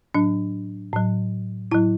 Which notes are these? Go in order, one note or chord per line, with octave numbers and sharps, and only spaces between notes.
A2 F#3 D4
A2 F#3
A2 F#3 E4